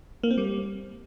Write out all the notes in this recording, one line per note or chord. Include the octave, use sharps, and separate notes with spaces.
A#3
C4
G3